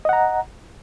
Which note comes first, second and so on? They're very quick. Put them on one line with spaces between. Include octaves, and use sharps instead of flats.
D#5 F#5 A#5